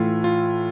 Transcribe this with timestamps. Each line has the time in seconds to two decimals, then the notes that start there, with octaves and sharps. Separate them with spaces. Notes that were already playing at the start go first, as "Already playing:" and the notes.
Already playing: A2 E3 A3 F4
0.24 F4